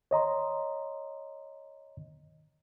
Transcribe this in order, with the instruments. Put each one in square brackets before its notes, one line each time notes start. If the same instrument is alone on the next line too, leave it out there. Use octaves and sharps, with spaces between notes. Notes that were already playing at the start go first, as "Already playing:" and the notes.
[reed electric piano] C#5 D#5 A#5 C6